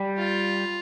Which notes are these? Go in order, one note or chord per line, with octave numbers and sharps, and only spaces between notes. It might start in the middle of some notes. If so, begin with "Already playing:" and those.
Already playing: G3
F4